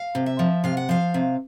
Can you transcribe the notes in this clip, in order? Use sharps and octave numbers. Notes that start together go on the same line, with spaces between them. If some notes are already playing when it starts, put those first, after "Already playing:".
Already playing: F5
C3
E5
F3
C3 F5
F#5
F3 F5
C3